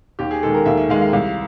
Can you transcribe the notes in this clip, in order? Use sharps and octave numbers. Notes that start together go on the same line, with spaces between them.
D#2 G4
G#4
D#3 G#3 A4
A#4
D#2 E5
E5
D#3 G#3 F5
F5
C2 F5